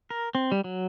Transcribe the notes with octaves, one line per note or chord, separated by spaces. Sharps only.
A#4
C4
G3
F#3